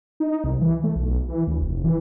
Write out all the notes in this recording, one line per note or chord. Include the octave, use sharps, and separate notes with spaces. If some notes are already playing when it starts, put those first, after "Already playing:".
D#4
C2
E3
A3
B1
E3
D2
F1
E3